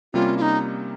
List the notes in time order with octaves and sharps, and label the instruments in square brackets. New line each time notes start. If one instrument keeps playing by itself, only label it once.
[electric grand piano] C3 G3 A#3 C#4 [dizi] F4
[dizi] F4
D#4